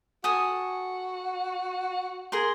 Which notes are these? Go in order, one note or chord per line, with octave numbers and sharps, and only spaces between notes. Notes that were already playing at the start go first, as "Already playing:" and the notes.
F#4 A4 G#5 D#6
G#4 A#4 C6